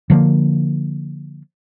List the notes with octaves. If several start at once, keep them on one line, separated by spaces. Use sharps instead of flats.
D3 F3 A3 A#3